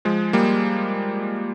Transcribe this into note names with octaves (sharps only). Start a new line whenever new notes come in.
F3 G#3
G3 A#3